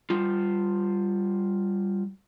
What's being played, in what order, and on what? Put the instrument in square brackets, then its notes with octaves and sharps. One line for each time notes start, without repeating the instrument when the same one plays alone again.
[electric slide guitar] G3 F4